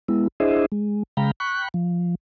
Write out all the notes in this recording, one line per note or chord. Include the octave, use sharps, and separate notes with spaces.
G#3 B3 E4
D4 E4 G#4 C5 D#5 E5
G#3
C#3 G#3 F5 G5 A#5 B5
G5 B5 C#6 F#6
F3